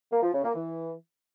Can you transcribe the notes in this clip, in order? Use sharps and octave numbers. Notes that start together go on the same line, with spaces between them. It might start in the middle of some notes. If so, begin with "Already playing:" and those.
A#3
F3
C#3
A#3
E3